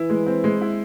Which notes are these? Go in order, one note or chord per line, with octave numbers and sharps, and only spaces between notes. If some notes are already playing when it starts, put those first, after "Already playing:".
Already playing: E3 E4
G#3
C4
G#3
E4